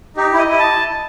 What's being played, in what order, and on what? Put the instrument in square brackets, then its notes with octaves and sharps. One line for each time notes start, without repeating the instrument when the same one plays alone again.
[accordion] D#4 [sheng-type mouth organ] G4
[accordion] E4
[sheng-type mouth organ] D#5
[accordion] E4
[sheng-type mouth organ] A5